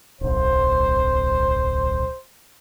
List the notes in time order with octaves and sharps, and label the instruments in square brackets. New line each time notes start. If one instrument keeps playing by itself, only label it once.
[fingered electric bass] D1 B1 [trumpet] C5